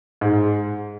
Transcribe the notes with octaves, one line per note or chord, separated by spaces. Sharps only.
G#2